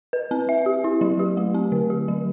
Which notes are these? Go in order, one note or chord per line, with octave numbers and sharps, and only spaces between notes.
B4
C4
E5
G4
E4
F#3
G4
A3
C4
D3
G4
F#3